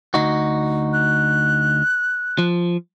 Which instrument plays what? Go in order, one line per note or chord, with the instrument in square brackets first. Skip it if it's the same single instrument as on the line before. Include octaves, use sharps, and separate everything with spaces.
[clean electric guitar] D2 D#4 F#4
[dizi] F#6
[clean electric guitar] F3